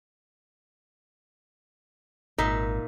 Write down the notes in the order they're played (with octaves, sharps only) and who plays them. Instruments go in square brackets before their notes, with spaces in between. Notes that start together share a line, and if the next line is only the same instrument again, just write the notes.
[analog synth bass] G#1 [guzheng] A#2 E5 C6 [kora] D#4